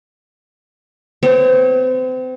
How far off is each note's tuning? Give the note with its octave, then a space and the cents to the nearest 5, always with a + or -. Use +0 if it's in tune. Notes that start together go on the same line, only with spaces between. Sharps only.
C4 -35 C#5 -35